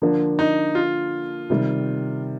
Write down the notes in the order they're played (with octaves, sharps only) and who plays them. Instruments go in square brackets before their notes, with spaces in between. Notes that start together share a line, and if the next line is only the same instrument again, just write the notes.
[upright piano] D3 F3 A#3 D4
[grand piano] D#4
F4
[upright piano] C3 D#3 G3